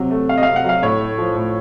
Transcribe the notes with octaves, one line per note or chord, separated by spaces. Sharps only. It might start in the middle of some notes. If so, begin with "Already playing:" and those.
Already playing: C3 F#3
A3
C3 F5
D#5
C3 F5
F#5
F#3 F5
A2 C#5
A3
F3
A2